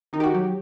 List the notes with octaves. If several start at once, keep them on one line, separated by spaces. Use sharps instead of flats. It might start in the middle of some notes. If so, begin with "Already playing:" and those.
D#3 D#4
G4
F#4
F#3 G4